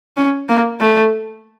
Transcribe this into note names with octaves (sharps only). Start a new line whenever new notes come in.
C#4
A#3
A3